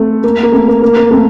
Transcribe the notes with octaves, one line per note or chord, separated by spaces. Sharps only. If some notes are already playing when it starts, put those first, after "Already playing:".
Already playing: A3 C4
A#3
A#3
A3 C4
A#3
A#3
A#3
A3 C4